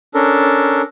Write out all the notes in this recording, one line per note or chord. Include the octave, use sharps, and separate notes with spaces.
C#4 D4 A4 A#4